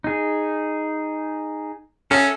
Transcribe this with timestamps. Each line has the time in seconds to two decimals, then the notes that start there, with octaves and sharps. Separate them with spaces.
0.04 D#4 G#4
2.11 C#4 A4 E5